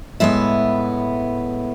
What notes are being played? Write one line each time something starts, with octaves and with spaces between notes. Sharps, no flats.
A2 G#3 B3 E5